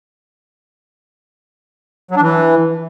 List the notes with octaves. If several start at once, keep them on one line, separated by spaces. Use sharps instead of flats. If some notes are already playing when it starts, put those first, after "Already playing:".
F#3
D4
E3